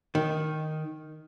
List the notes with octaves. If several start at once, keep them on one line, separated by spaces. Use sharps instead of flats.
D#3